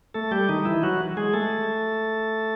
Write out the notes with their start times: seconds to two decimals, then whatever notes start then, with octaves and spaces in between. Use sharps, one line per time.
0.14 A3 A4
0.31 G3 G4
0.49 D#3 D#4
0.65 E3 E4
0.83 F#3 F#4
1.17 G#3 G#4
1.33 A3 A4